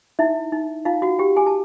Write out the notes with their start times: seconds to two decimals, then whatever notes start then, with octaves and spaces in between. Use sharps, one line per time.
0.19 D#4 E4 E5
0.52 D#4
0.85 D#4 F4 F5
1.02 F#4 F#5
1.19 G4 G5
1.36 G#4 G#5
1.47 A5